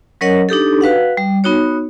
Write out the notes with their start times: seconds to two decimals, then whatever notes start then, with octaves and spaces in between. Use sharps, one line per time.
0.21 F#3 C#4 A#4 C#5 D#5 F#5
0.49 D4 D#4 G4 A4
0.81 F#4 B4 F5 F#5
1.17 G3
1.44 B3 D#4 F#4 C#5